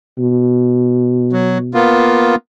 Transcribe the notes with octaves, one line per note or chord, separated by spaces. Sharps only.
B2
F#3
A#3 B3 F4